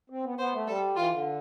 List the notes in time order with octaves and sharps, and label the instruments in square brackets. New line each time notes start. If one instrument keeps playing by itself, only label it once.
[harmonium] C4
B3
[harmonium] B3 [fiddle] C5
[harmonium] A3
[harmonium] G3 [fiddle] A4
[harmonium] E3 [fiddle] F4
[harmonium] D3